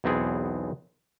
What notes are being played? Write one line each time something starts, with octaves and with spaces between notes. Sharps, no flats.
B1 E2 B3 C4 G#4